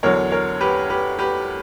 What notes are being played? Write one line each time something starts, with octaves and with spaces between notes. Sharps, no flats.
E2 D3 F#3 A#4 C#5
A#4 C#5
G4 B4
G4 B4
G4 B4